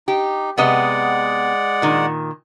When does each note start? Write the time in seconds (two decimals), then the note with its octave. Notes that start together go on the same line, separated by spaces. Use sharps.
0.08 D#4 G4
0.58 C3 G#3 B3 D5 D#5 F#5
1.82 A#2 D#3